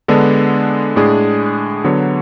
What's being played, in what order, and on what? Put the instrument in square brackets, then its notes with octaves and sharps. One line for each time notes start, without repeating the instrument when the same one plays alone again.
[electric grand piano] D3 G#3 B3 D4 A4
A2 G#3 D4 G#4
D3 F#3 B3 F#4 C#5